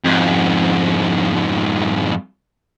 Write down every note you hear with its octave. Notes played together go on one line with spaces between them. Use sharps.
F2 G#2